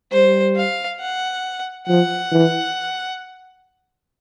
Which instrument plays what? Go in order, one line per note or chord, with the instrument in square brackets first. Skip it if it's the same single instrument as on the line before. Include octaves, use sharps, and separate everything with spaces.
[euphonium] G3 [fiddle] C5
[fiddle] F5
F#5
[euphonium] F3 [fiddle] F#5
[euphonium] E3